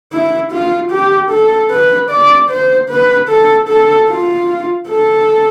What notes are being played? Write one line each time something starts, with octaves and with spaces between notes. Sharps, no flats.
E4
F4
G4
A4
B4
D5
C5
B4
A4
A4
F4
A4